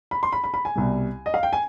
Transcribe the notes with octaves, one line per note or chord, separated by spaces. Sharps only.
B5
C6
B5
B5
B5
G#5
C2 B2 G3
D#5
F5
G5
G#5